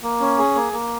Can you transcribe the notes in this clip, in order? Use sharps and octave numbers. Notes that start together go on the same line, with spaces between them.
A#3
C#4
G#4
A#3
A#3